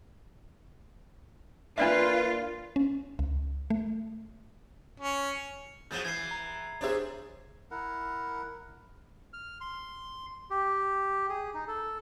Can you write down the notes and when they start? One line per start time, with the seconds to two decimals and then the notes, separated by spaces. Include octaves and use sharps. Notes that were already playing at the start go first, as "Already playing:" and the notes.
1.78 A#2 D4 F4 B4 D5 E5
2.76 C#4
3.19 C#2
3.70 A3
5.00 C#4
5.91 F3 F#3 G#3 G6 A6
6.05 E3 G#6 C7
6.31 A#5
6.81 D4 G#4 C5 C#5 E5
7.71 E4 A#4 F#5
9.33 F6
9.61 C6
10.51 G4
11.29 G#4
11.54 D#4
11.68 A4